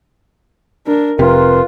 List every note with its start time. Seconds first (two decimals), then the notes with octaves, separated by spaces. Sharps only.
0.87 D4 A#4
1.19 F1 C3 F4 A#4 B4 C6